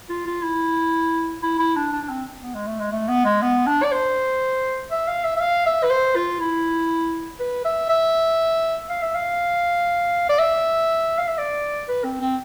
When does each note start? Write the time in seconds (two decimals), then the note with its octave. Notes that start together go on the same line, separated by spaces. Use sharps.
0.09 F4
0.27 F4
0.43 E4
1.43 E4
1.59 E4
1.76 D4
1.92 D4
2.03 D4
2.10 C4
2.42 B3
2.54 G#3
2.67 A3
2.80 G#3
2.92 A3
3.08 B3
3.25 G#3
3.42 B3
3.66 D4
3.83 D5
3.92 C5
4.91 E5
5.08 F5
5.24 E5
5.37 E5
5.41 F5
5.66 E5
5.83 B4
5.91 C5
6.16 F4
6.40 E4
7.40 B4
7.65 E5
7.89 E5
8.90 F5
9.02 E5
9.15 F5
10.29 D5
10.39 E5
11.18 F5
11.28 E5
11.38 D5
11.88 B4
12.04 C4
12.21 C4